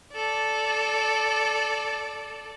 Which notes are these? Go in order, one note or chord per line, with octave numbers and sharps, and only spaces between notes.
A4 D5